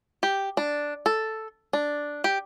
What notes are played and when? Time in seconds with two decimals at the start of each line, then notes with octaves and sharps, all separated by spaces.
0.23 G4
0.57 D4
1.06 A4
1.73 D4
2.24 G4